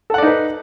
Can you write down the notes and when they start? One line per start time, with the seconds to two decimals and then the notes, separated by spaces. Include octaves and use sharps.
0.10 A4
0.14 F#5
0.18 D5
0.23 D#4
0.27 B4